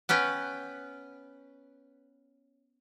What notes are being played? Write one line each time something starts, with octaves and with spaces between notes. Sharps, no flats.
B3 C#4 B4 G5